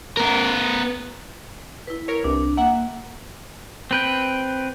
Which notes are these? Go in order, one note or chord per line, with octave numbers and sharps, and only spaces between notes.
B3 A#4
E4 B4
A#4 C#5
C2 D4
A#3 E5 F#5
C4 B4 G5